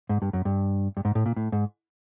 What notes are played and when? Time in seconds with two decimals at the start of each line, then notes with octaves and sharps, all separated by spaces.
0.09 G#2
0.22 G2
0.33 F#2
0.45 G2
0.97 G2
1.05 G#2
1.15 A2
1.26 A#2
1.36 A2
1.52 G#2